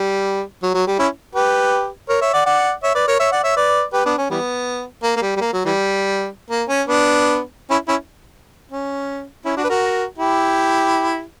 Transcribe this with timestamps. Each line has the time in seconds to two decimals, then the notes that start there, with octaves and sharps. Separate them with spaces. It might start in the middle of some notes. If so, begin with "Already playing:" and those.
Already playing: G3
0.62 F#3
0.74 F#3
0.87 G3
0.99 C#4 E4
1.35 G4 B4
2.09 A#4 C#5
2.21 C#5 E5
2.33 D5 F#5
2.46 D5 F#5
2.83 C#5 E5
2.95 B4 D5
3.07 A#4 C#5
3.19 C#5 E5
3.32 D5 F#5
3.44 C#5 E5
3.56 B4 D5
3.93 G4 B4
4.05 B3 D4
4.18 C#4
4.30 E3 G3 B3
5.03 A#3
5.16 A#3
5.22 G3
5.36 G3
5.41 A#3
5.53 F#3
5.65 E3 G3
6.50 A#3
6.69 C#4
6.87 B3 D4
7.70 C#4 E4
7.88 C#4 E4
8.71 C#4
9.45 C#4 E4
9.57 D4 F#4
9.64 B4
9.69 F#4 A#4
10.18 E4 G4